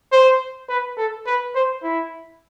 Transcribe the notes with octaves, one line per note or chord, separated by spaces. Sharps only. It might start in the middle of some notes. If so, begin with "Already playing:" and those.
C5
B4
A4
B4
C5
E4